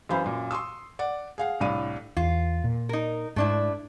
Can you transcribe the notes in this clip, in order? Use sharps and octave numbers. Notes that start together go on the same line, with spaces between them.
F#2 E3 C5 F5 B5
F#2 A#2
C6 C#6 D#6 E6
D5 F#5
G#4 F5 F#5
C2 A2 D4 F5 D#7
E2 F4
A#2
D#4 A#4
G#2 A3 D4 E4